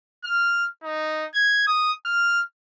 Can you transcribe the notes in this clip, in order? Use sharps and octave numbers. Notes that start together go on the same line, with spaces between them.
F6
D#4
G#6
D#6
F6